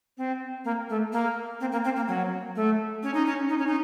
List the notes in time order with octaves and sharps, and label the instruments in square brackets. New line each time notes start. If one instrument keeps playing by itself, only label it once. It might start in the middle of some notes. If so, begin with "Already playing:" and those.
[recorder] C4
A#3
A3
A#3
C4
A#3
C4
A#3
F#3
A3
C#4
D#4
C#4
D#4
C#4
D#4